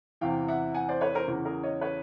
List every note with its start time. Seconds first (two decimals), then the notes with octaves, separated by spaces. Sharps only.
0.21 E2 C3 E3 F5 G5
0.48 E5 F#5
0.74 F#5 G#5
0.88 C5 D5
1.01 B4 C#5
1.15 A#4 C5
1.28 E2 C#3 E3
1.45 G#4 A#4
1.63 C#5 D#5
1.81 B4 C#5